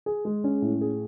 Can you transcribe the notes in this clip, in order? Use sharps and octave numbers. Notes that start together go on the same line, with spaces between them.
G#4
G#3
C#4
A2
G#4